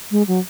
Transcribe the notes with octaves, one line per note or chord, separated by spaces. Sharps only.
G#3
F#3